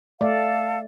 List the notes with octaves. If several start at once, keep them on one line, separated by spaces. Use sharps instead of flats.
A3 A4 D5 F5